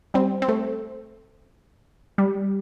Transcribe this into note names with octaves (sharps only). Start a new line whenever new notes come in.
G3 C4
C4
A3
G3